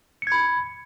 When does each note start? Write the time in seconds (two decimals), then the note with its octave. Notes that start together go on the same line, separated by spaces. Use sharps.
0.22 C#7
0.27 G#6
0.32 B5